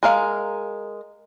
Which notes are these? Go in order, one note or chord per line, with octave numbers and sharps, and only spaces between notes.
G#3 A#4 F5